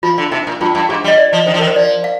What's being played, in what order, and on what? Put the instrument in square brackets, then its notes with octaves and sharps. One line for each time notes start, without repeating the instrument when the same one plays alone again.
[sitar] F3 [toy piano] F4
[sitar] D3
[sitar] C3 [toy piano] D#4
[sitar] A#2
[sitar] G2 [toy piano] F4
[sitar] G2
[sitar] G#2 [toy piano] G4
[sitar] G3
[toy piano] D#5
D5
[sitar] F3
[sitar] D#3 [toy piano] C5
[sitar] F3
[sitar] D#3 [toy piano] A#4
[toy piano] C5
[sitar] F3 [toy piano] D5
[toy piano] F5